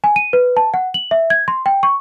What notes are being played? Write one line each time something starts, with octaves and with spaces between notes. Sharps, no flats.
G#5
D#7
B4
A5
F#5
F#7
E5
G#6
C6
G5
C#6